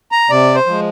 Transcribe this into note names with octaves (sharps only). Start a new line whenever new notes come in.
A#5
C3 D5
C5
F3 G#3